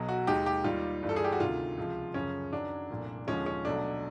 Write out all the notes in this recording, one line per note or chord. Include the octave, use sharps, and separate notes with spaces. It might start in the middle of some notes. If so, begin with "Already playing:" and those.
Already playing: B1 B2 F#3
F#4
D#2 D#3 G#3 G4
G4
D#2 D#3 G3 F4
G1 G2 E3 G3
A4
G#4
G4
F#4
D2 C3 D#3 F4
C#2 C3 F3
F#2 C#3 F3 C#4
F#2 D#3 F#3 D4
C2 A#2 F3 A3
D#2 D3 F3 G#3 C#4
C#4
B1 B2 F#3 A3 D4